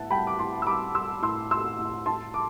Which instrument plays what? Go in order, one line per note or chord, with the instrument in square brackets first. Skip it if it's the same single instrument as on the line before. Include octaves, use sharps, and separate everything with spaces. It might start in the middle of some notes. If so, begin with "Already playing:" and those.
Already playing: [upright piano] A2 B3 E5 F#5 A5
G3 G5 B5
D6
A2 A5 C6
E6
G3 B5 D6
G3 C6 E6
A2 C6 E6
A2 C6 E6
A2
E4 A5 C6
D6